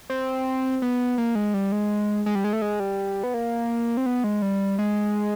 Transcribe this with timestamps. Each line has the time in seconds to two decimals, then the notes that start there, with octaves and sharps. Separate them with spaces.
0.10 C4
0.82 B3
1.18 A#3
1.35 G#3
1.54 G3
1.72 G#3
2.26 G#3
2.35 G3
2.44 G#3
2.53 A3
2.62 G#3
2.80 G3
3.23 B3
3.34 A#3
3.97 C4
4.06 B3
4.24 G#3
4.42 G3
4.79 G#3